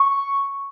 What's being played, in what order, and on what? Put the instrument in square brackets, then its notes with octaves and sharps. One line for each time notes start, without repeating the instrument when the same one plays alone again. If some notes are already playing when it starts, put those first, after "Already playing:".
Already playing: [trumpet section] C#6